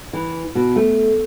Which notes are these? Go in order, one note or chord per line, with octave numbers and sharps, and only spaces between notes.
E3
B2
A3